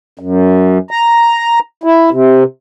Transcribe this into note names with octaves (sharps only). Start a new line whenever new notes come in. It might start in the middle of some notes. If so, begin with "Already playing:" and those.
F#2
A#5
E4
C3